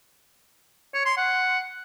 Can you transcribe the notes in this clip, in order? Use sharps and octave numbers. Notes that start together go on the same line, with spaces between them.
C#5
C6
F#5